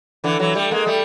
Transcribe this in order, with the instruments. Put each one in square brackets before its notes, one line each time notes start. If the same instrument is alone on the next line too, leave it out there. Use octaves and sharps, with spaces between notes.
[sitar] D3 E3
E3 F#3
G3 A3
G#3 A#3
G3 A3